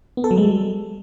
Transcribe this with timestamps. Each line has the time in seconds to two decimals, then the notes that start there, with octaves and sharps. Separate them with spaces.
0.17 B3
0.24 A4
0.31 F#3
0.38 G#3
0.44 G3